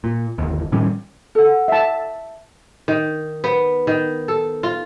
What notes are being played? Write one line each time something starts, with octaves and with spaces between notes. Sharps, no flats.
A#2
G1 D#2
A2 D#3 G3 C#4
A4 F#5
E5 A5
D#3
B3
D#3
A4
F4